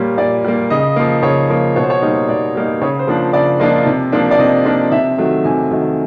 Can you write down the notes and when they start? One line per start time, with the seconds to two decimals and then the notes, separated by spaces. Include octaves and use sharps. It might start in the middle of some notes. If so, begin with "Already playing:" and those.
Already playing: A#2 G3 A#3 C#5
0.18 A#2 D5
0.44 G3 A#3
0.70 C#3 D#5
0.96 F3 A#3
1.23 C#3 C#5
1.49 F3 A#3
1.76 B2 C#5
1.83 C5
1.90 C#5
2.02 G3 A#3 D#4
2.29 B2 D5
2.55 G3 A#3 D#4
2.81 C#3 C#5
2.99 C5
3.07 F3 A#3 D4 F4
3.33 C#3 D5
3.59 F3 A#3 D4 F4 D#5
3.86 C3
4.12 F3 A#3 D4
4.31 D5
4.38 C3 D#5
4.65 F3 A#3 D4
4.92 C3 E5
5.18 D#3 F#3 A3
5.45 C3 G#5
5.70 D#3 F#3 A3